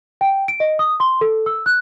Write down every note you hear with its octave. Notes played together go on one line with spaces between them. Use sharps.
G5
D7
D#5
D#6
C6
A4
E6
F#6